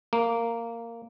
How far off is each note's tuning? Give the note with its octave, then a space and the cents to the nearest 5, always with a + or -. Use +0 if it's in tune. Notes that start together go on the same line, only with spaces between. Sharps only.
A#3 -10